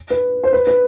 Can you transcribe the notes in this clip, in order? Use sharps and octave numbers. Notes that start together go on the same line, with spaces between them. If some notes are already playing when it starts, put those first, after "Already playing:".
B4
C5
B4
B4